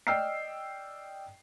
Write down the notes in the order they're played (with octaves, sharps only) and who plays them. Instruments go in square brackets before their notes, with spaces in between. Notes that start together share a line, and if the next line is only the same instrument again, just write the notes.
[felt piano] D5 D#5 G5 E6 F6 C7